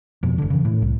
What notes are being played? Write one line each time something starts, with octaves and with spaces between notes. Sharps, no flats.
F2 B2
G1 D3
C#3 E3
A2
C2